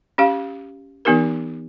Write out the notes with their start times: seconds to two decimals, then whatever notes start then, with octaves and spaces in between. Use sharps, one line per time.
0.18 C#4 G4 F5
1.05 E3 B3 D#4 G4 A#4